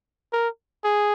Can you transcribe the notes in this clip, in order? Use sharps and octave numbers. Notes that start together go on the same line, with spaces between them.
A#4
G#4